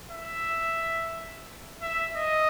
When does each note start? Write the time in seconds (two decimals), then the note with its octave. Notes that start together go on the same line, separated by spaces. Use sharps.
0.11 E5
1.82 E5
2.17 D#5